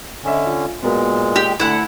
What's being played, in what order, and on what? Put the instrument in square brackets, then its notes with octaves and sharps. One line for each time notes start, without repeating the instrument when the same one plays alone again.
[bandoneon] D3 C#4 [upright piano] D#5 E5
[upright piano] F4
[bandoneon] A#2 G#3 [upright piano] B3 F#4 A#4
[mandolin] G4
[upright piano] D2 A5 [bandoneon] D3 [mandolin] E4 F#5